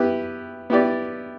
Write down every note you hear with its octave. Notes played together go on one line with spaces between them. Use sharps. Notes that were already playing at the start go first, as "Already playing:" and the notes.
Already playing: B3 E4 G4 B4
B3 E4 G4 D5